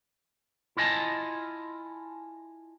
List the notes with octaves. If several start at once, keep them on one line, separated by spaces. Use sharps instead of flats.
E4 F4 D#5 G#5 A5